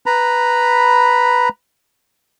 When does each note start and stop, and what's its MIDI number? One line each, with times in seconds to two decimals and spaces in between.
0.06 1.49 71
0.06 1.49 82
0.06 1.49 83